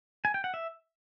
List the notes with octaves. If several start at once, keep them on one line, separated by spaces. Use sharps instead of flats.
G#5
G5
F#5
E5